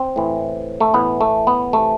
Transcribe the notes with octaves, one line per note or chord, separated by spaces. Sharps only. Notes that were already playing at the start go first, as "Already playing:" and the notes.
Already playing: C4
A2 E3
A3
A2 E3 B3
A3
B3
C3 E3 A3